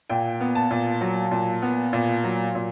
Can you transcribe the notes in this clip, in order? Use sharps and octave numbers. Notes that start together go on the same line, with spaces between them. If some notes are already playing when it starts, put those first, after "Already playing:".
A#2 G5
B3
A5
A#2
F#3
A#2
B3
A#2
F#3
A#2